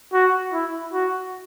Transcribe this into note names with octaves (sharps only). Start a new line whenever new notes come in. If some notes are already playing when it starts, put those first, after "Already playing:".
F#4
E4
F#4